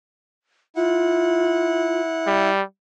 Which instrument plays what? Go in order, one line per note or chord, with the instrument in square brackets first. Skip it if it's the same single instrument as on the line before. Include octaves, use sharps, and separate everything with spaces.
[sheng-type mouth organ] E4 F#5 [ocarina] F4
[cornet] G3